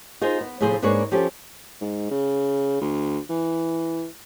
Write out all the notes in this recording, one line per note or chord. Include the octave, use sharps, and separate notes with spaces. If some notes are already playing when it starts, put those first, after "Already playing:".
D#4 F4 G#4 C5
B3
A2 C3 F3 G#4 C5
G#2 A#3 D4 G#4 B4 C#5
F3 C#4 G4 A4
G#2
C#3
D2
E3